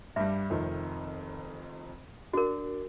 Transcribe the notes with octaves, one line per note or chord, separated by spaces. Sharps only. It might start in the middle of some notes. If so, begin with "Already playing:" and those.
G2 G3 E5
F1 F2 D#3
D4 F#4 A#4